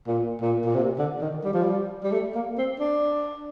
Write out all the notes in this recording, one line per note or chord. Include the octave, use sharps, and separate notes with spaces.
A#2
A#2
A#2
C3
D3
D#3
G3
F3
G3
G3
A3
A#3
C4
D4